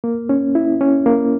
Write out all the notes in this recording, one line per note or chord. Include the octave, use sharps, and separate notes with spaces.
A#3
C#4
E4
C#4
A#3